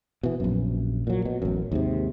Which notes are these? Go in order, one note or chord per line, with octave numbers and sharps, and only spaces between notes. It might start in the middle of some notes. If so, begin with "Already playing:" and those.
B2 E3
A#1 F#2
A#2 F#3
B2
A1 F#2
D#2 G#2 C3